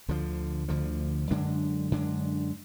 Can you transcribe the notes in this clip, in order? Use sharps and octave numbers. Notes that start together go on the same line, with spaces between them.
D2 D3 F3
D2 D3 F3
F#2 D3 G#3 D4
F#2 D3 G#3 D4